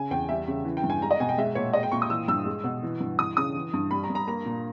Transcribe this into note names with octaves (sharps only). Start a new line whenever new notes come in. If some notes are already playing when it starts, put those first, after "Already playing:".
Already playing: C#3 G#5
E2 G5
G3 E5
C#3
E3
G5
G2
G#5
G#3 A#5
D#5
B2 G#5
G5
G#3 E5
A#2 C#5
G#3 D#5
G5
A#2 C#6
D#6
E3 E6
G2 E6
G#3
B2
E3
G2
E3 D#6
C#3 D#6
E3
G2
G3 B5
A#5
G2
A#5
A#3 A#5
A#2